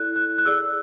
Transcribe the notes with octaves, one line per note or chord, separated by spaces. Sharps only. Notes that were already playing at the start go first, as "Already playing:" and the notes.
Already playing: E4 A4 D5 F#6
F#6
F#6
G#4 D5 E6